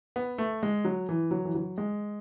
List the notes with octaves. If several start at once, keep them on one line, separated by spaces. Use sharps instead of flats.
B3
A3
G#3
F#3
E3
F#3
E3
F#3
G#3